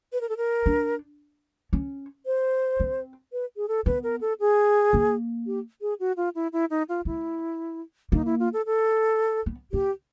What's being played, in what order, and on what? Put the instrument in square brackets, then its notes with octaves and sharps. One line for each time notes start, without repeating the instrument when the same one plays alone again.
[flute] B4
A#4
A4
A#4
[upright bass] D4
C#4
[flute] C5
[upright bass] C4
[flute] B4
G#4
A4
[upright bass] B3 [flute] B4
[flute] A#4
A4
G#4
[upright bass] A#3
[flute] G4
G#4
F#4
F4
E4
E4
D#4
F4
[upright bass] A3 [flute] E4
[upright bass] A#3 [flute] D#4
[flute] E4
F4
A4
A4
[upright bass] B3
[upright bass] A#3 [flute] G4